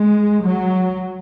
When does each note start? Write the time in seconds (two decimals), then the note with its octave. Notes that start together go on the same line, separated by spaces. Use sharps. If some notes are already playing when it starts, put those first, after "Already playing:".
Already playing: G#3
0.45 F#3